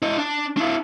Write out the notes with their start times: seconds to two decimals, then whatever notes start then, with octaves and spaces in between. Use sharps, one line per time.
0.02 E4 D#5
0.17 D4
0.57 D4 E4